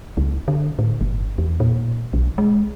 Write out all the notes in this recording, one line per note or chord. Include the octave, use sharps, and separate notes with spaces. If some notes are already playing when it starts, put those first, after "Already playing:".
C#2
D3
A2
G1
E2
A#2
B1
G#3